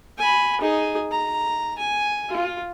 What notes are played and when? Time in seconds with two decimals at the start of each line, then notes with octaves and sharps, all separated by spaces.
0.18 G#5 B5
0.61 D#4 G#4
1.12 A#5
1.78 G#5
2.30 F4